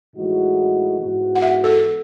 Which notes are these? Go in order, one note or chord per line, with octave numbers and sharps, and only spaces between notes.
A2 E3 G#3 D#4 F#4
G#2 E3 B3 F#4
F#5
E5
A4